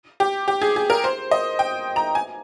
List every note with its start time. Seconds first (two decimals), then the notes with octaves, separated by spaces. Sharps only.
0.20 G4
0.48 G4
0.62 G#4
0.76 G#4
0.90 A#4
1.04 C5
1.31 D#5
1.59 G5
1.96 A#5
2.15 G#5